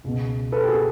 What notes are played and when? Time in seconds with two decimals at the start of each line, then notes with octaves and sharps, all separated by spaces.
0.04 C#2 B2
0.52 A4 B4
0.64 G4
0.68 F#4 G#4